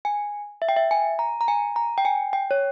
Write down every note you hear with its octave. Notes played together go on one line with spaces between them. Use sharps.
G#5
E5
G5
E5
G#5
A#5
A#5
G#5
A#5
G5
G#5
G5
C#5